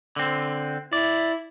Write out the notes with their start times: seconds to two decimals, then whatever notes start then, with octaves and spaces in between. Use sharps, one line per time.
0.16 D3 C4
0.93 E4 D5